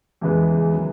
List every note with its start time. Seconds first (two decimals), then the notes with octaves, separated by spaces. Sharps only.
0.21 E2 C#3 E3 G#3 B3
0.72 D#3 F#3 C#4